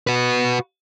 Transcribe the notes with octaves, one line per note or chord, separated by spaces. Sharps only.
F#4 B4